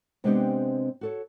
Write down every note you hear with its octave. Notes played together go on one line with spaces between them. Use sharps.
C3 G#3 B3 C4 D4 G4
F#4 A4 C#5